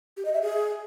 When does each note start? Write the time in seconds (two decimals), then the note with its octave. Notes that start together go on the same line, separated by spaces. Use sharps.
0.17 G4
0.25 D#5
0.33 E5
0.42 G#4